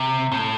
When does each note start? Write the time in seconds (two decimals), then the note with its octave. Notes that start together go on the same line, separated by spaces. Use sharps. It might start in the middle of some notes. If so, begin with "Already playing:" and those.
Already playing: C3
0.32 A2